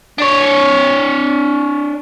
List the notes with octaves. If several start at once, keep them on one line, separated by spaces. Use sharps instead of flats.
D4 C#5